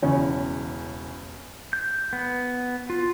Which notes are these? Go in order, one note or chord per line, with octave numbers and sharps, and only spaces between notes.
E1 E2 C#3 C#4 C#5
G6
B3
F4